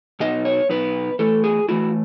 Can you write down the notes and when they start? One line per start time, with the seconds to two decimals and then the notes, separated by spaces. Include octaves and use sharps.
0.20 B2 F#3 B3 D#4 D#5
0.45 C#5
0.69 B2 F#3 B3 D#4 B4
1.19 E3 A3 E4 A4
1.44 G#4
1.68 E3 A3 E4 F#4